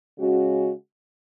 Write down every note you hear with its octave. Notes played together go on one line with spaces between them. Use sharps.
C#3 G#3 C#4 F#4